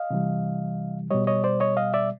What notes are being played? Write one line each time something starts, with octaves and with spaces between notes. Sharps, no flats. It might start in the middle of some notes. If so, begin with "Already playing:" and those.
Already playing: D#5 F5
C3 E3 G3
B2 G3 C#5 D#5
C#5 D#5
C5 D5
C#5 D#5
D#5 F5
D5 E5